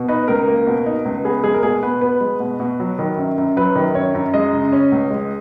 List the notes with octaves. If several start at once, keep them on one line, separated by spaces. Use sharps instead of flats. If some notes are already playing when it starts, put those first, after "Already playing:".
Already playing: B2
D#4 B4
C#2 A#4
A#3
B2
D#4
C#2
B3 G#4
G#3 G#4
A#4
B2 G#4
B2 B4
B3 B4
G#3
B2
B2
F#3
D#3
F#2
F#2
F#3 B4
D#3
F#2 C#5
F#2
G#3 D#5
C#3
C#4
C#2
G#3